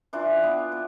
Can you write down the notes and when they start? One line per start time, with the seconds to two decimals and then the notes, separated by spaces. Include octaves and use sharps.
0.13 E3 D4 F4
0.43 B3
0.72 B3